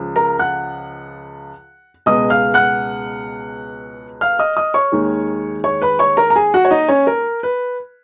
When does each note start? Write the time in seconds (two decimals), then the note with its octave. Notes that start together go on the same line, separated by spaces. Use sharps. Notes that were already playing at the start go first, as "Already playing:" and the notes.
Already playing: C#2 C#3 F3
0.16 A#4 A#5
0.39 F#5 F#6
2.06 C#2 B2 G#3 D#5 D#6
2.30 F5 F6
2.54 F#5 F#6
4.21 F5 F6
4.39 D#5 D#6
4.57 D#5 D#6
4.74 C#5 C#6
4.92 D#2 D#3 G#3
5.64 C#5 C#6
5.82 B4 B5
5.99 C#5 C#6
6.17 A#4 A#5
6.30 A#5
6.36 G#4 G#5
6.54 F#4 F#5
6.65 C#5
6.71 D#4 D#5
6.88 C#4 C#5
7.07 A#4
7.43 B4